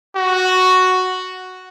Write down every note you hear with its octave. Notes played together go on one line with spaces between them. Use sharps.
F#4